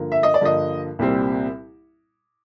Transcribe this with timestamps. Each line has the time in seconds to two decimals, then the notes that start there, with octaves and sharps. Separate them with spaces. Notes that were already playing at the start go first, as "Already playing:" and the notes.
Already playing: G2 D3 F3 A#3
0.12 E5
0.23 D#5
0.34 D5
0.41 G2 D3 F3 A#3 D#5
0.99 C2 A#2 G3 C4